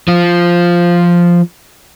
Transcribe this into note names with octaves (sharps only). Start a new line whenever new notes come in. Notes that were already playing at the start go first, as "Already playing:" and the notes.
F3 F4